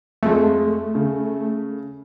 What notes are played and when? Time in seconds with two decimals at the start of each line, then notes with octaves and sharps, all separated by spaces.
0.23 F2 G#3 A3
0.95 C#3